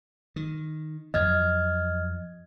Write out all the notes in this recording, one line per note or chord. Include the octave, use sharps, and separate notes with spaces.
D#3
F2 F3 F#3 D#5 F6 G#6